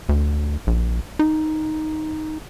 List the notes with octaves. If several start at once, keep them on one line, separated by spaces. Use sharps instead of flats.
D2
A#1
D#4